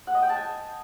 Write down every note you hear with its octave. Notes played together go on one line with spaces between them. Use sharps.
F#5
D#5
G5
A5
G#5